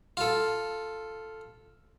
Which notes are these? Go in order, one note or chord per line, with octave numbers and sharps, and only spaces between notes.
F4 A4